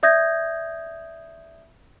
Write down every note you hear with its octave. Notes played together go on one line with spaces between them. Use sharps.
D5 E5 D#6 G6 G#6 A#6